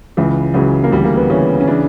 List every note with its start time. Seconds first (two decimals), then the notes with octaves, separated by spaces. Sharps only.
0.17 C#2 C#3 E3
0.54 C#2 C#3 E3 F#3
0.84 A#3
0.92 D2 C#3 E3 G3
1.04 A#3
1.17 B3
1.30 D2 C#3 E3 C#4
1.60 C#4
1.67 C#3 E3 D4